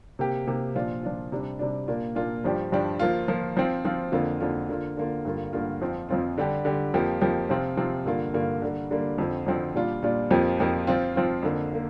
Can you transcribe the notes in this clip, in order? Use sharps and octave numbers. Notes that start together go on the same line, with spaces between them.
C3 A#3 G4
C3 A#3 G4
A#2 F3 D4 F4
A#2 F3 D4 F4
C3 G3 D4
C3 G3 D4
A#2 A#3 D4 F4
A#2 A#3 D4 F4
G2 F3 D4 G4
G2 F3 D4 G4
F3 A#3 F4
F3 A#3 F4
F3 C4 F4
F3 C4 F4
F2 D3 A#3 F4
F2 D3 A#3 F4
D3 A#3 F4
D3 A#3 F4
G2 D3 A#3 F4
G2 D3 A#3 F4
F2 F3 C4 F4
F2 F3 C4 F4
D3 G3 D4 G4
D3 G3 D4 G4
F2 F3 A#3 G4
F2 F3 A#3 G4
C3 F3 C4 F4
C3 F3 C4 F4
G2 D3 A#3 F4
G2 D3 A#3 F4
D3 G3 A#3
D3 G3 A#3
F2 D3 F3 C4
F2 D3 F3 C4
A#2 G3 D4 F4
A#2 G3 D4 F4
F2 F3 A#3 G4
F2 F3 A#3 G4
F3 C4 F4
F3 C4 F4
F2 D3 A#3
D3 A#3